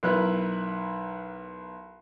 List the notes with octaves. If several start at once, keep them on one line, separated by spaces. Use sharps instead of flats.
B1 E4 A#4 B4 F#6